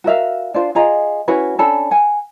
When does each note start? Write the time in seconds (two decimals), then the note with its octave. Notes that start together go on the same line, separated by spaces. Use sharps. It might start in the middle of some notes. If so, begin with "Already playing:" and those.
0.04 F#4 A#4 E5 F5
0.54 D4 F4 C5
0.75 F4 G#4 D#5 A#5
1.28 C#4 E4 F#4 B4
1.59 C#4 D4 A4 B5
1.91 F#5 G#5